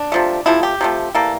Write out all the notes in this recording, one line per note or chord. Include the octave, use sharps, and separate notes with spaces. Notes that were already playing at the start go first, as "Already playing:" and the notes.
Already playing: D4
C3 F3 A3
C3 F3 A3 E4
G4
C3 F3 A3
E3 G3 A#3 A4